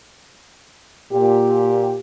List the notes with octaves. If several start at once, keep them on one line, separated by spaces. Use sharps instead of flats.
A#2 G4